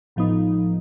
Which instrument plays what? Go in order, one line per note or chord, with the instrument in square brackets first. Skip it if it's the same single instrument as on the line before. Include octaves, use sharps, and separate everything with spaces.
[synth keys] G#1 A2 F3 B3 D#4